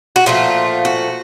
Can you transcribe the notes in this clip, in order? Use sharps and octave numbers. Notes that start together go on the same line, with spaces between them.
F#4
A#2 F3 A3 F4
F#4